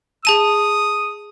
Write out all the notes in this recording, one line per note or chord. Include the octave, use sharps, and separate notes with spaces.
G#4 A5 D#6 D#7